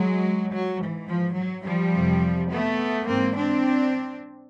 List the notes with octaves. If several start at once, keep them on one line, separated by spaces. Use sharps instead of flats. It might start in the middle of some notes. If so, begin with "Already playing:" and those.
Already playing: F#3 G#3
F#3
G#2 E3
F3
F#3
F3 G3
F2 C3 E3
A3 B3
G#2 E3 A#3 C4
C4 D4